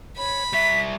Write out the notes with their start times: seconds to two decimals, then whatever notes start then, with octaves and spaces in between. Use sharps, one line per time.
0.17 C#5 B5
0.53 G3 E5 B6